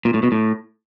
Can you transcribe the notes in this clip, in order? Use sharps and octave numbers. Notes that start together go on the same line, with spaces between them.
A#2
A2
B2
A2